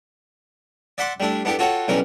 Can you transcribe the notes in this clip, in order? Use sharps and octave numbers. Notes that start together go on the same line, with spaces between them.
D5 E5 F#5 B5 C6 D6
G3 A3 D4 E4
B3 D4 E4 G4 A4
F4 F#4 A4 C#5 F#5 G5
B1 E3 G3 C#4 A#4 D6